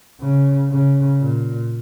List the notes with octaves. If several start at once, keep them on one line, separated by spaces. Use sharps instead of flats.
C#3
C#3
A#2